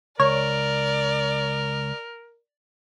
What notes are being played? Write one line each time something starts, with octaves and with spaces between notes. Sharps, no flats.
C#2 A#4 C#5 D5